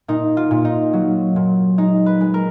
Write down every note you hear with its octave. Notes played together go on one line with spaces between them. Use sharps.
A#2 D#4
F4
A#2
D#4
F#3
A#2
G#3 D#4
B4
G#3
A#4